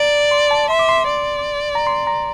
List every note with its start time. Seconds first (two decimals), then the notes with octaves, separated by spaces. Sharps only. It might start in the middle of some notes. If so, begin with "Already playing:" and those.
Already playing: D5 A#5
0.31 C6
0.51 A5
0.70 E5 C6
0.79 D6
0.89 C6
1.09 D5
1.75 A#5
1.87 C6
2.07 A#5